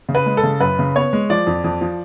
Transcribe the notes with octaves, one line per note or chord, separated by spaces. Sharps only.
C#3
B4
G#3
A4
C#3
F#2 B4
C#3
B3 C#5
G#3
F3 D5
F2
F2
F3